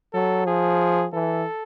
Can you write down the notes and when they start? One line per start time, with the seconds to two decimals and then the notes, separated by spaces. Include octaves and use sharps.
0.13 F#3 A4
0.46 F3 G#4
1.13 E3 A4